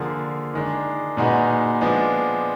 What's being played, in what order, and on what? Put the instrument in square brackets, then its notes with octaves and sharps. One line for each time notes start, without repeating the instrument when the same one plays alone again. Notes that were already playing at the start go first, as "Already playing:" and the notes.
Already playing: [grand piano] D3 F3 A#3 F4 G#4
D#3 G#3 D4
A#2 G#3 D#4 F#4 B4
F3 G#3 B3 D4